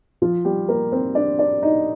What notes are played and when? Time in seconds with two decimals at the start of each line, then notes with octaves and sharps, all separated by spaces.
0.22 F3 F4
0.45 G3 G4
0.69 A#3 A#4
0.92 C4 C5
1.15 D4 D5
1.39 D4 D5
1.62 D#4 D#5